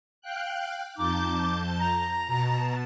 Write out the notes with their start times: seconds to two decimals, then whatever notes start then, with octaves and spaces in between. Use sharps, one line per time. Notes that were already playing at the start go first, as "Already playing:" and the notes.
0.21 F5 G5 F#6
0.97 F2 D#4 A5 D6 G6
1.79 A#5
2.27 B2 A5